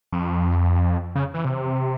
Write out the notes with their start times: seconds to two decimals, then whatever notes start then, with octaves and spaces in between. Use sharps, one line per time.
0.12 F2
1.15 C#3
1.34 E3
1.45 C3